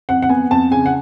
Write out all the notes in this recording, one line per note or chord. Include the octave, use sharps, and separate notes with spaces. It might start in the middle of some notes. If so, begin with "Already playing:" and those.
F2 F#5
F#5
B3 G#5
F2 A5
C#3 G#5
F#5